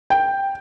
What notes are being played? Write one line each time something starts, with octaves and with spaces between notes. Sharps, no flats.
G5